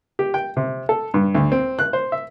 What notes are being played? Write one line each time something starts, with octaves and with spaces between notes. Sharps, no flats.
G4
G5
C3
A4
G2
D2
C4
F#6
C5
E5